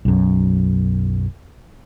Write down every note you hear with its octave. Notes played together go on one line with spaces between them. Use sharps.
B1 F#2